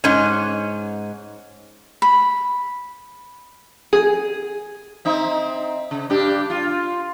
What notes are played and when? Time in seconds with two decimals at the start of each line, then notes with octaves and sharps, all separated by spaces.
0.04 G#2 C#4
2.02 B5
3.93 G#4
5.05 C4 D#4 E5
5.91 C#3
6.10 G2 D4 G4
6.50 F4